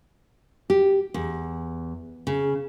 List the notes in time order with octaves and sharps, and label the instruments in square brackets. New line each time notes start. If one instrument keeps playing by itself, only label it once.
[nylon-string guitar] G4
E2
C#3